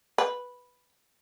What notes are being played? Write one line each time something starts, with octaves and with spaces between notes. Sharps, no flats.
B4